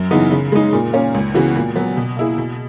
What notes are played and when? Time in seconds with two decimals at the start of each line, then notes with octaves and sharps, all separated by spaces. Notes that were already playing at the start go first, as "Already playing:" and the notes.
Already playing: F#2
0.11 C#3 E3 B3 D#4
0.31 C#3
0.52 G#3 D#4
0.73 A#2
0.93 A#3 C#4
1.14 C#2
1.34 C#3 E3 B3 F#4
1.55 A#2
1.76 F#3 B3
1.97 B2
2.17 A#3 E4 G#4
2.38 B2